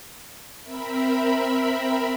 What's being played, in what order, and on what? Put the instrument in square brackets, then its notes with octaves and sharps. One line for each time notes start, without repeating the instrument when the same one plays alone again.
[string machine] C4 A#4 E5 B5